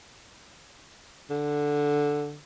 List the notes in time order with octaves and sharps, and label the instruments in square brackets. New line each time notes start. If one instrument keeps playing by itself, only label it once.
[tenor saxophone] D3